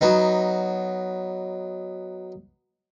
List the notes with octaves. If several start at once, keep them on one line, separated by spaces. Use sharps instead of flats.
F#3 B3 D#4